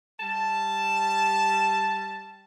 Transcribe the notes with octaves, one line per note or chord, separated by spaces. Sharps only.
G3 A5